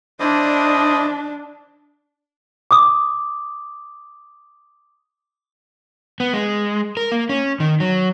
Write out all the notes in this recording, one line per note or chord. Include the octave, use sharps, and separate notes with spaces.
D4 E4 C5 D5 D#5 D#6
D6 D#6
B3
G#3
A#4
A#3
C#4
D#3
F#3